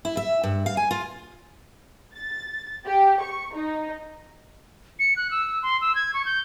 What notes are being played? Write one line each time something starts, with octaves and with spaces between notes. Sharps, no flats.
E4
E5
G2
F5
G#5
F4
A6
G4
C#6
D#4
C#7
F#6
E6
C6
E6
G#6
C#6
G6